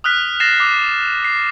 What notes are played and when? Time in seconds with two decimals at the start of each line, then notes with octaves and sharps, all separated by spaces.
0.04 D#6 F6 F#6 B6
0.40 A6 A#6 C7 E7
0.59 D6 C7
1.24 C7